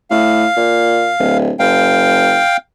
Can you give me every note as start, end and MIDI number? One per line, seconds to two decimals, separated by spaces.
0.11 0.45 45
0.11 1.38 77
0.57 1.11 46
1.19 1.51 26
1.59 2.42 30
1.59 2.57 77
1.59 2.57 79